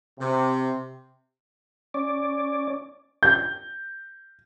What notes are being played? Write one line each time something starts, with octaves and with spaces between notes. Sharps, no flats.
C3
C#4 D5
G6